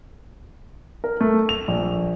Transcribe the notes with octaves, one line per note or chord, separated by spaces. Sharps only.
A#4
A3
F7
A#1